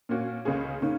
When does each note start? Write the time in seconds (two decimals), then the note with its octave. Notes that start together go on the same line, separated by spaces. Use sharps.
0.09 A#2 A#3 C#4 F#4
0.45 C#2 C#3 A#3 C#4 G#4
0.81 C#3 A#3 C#4 D#4